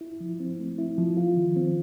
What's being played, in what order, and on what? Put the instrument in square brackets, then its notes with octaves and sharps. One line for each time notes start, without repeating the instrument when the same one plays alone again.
[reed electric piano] E4
F3
C4
A3
E4
F3
F4
D#3
C4